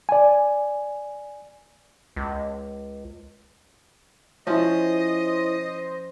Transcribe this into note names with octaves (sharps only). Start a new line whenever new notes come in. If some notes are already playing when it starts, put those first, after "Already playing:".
D5 G#5
C#2
F3 C#4 E4 F4 C5 C#5 D#5